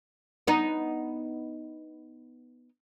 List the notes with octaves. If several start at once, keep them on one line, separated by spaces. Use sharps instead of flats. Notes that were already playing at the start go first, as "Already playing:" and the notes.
B3 D#4